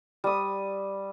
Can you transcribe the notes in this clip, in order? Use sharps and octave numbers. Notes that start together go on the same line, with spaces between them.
G3 D#6